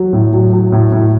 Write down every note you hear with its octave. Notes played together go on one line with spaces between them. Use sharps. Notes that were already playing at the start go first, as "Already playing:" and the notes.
Already playing: F#3
A2
F#3
F#3
A2
A2